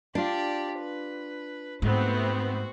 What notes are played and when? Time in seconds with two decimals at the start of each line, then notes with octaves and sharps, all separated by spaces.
0.15 D4 F4 G4 D5
0.79 B4
1.82 G#2 A3 B3 C4 F#4 C5